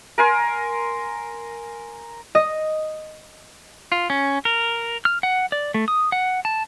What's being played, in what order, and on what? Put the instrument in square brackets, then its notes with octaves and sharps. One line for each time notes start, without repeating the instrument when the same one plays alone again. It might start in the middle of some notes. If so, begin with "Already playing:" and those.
[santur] A#4 G#5 C6
[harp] D#5
[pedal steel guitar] F4
C#4
A#4
F6
F#5
D5
A3
D#6
F#5
A5